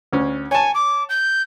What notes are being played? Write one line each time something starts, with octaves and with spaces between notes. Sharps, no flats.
D2 C#4
C#5 G#5 A5
D6
G6